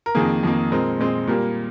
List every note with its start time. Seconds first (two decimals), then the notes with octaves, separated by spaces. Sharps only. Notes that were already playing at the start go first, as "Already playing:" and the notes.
0.06 A#4
0.15 F2 D#3 A#3 G#4
0.43 F2 D#3 A#3
0.72 A#2 G#3 C4 A#4
0.99 A#2 G#3 C4
1.27 A#2 G3 A#3 A#4